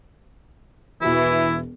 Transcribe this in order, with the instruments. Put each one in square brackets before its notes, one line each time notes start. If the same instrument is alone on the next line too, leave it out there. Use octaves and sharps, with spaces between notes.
[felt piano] E1 F#4 B4 [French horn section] E3 [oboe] E4